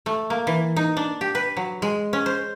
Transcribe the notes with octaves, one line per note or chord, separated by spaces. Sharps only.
A3
A#3
E3
D#4
D4
G4
B4
F#3
G#3
C#4
C5